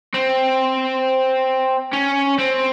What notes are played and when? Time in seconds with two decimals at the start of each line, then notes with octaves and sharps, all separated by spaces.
0.14 C4
1.93 C#4
2.38 C4